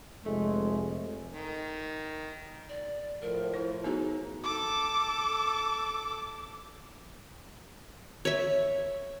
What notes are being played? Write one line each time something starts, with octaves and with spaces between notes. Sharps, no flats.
F1 G#3 A3
D#3
D5
A2 F3 A#4
E4 C5
B3 D#4 F#4 G#4
A4 D6
C#5 E5